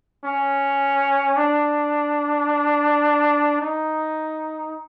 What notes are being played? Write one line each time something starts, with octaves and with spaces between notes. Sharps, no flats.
C#4
D4
D#4